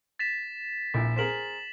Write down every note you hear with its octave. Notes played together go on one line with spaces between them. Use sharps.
A6 B6 E7
A#1 E4 E5
G#4 A#4 C5 B6 E7 F#7